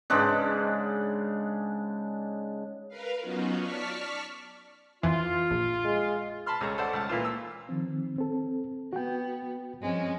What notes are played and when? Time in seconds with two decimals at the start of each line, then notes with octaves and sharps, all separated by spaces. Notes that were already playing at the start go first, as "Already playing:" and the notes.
0.10 G#2 C#3 G#3 D4
2.89 A#4 B4 F5
3.20 F#3 B3 C#4 D#4 F4 F#4
3.60 D5 A5 C#6 F6 B6
5.03 F2 E3 F4
5.51 A#1
5.85 G#3
6.46 A5 B5 C6 F6
6.61 C#2 C#4 G#4 A4 A#5 C#6
6.78 A4 C5 D5 F#5
6.93 C#2 A5
7.09 A#2 E3 F4
7.25 E6
7.69 D#3 F3 C4
8.18 C4 A4
8.93 B3 F#4 G5
9.81 G2 F3 G#3 C4 C#4